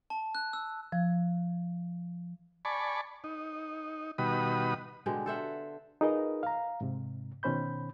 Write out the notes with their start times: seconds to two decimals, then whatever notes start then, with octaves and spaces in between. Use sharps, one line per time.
0.10 A5
0.35 F#6
0.53 E6
0.92 F3
2.65 D5 G#5 A5 B5 C#6
3.24 D#4
4.18 B2 D#3 G3 F#4 B5 D#6
5.06 B2 D3 G#3 G4
5.26 A4 C5 E5 F#5
6.01 D#4 F4 G#4 A#4 B4 D#5
6.43 F5 A#5
6.81 G#2 C3
7.43 B2 D#3 C#4 C5 B5 G6